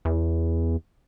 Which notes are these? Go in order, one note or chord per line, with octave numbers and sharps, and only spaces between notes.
E2